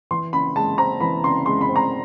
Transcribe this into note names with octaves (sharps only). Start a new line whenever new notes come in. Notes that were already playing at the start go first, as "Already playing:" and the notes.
E3 C6
C#3 B5
G#3 A5
C4 A#5
E3 B5
C#3 C6
G#3 C6
B5
C4
A#5